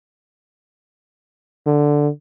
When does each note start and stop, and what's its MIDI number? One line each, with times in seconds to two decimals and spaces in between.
1.66 2.09 50